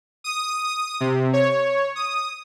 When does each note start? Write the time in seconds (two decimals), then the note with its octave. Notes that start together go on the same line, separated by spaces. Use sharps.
0.24 D#6
1.00 C3
1.33 C#5
1.96 D#6